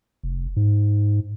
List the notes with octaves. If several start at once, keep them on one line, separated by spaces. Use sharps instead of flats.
F1
G#2